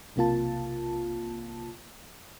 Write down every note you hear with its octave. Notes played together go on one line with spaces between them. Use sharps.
B1 C3 A#3 F4 A5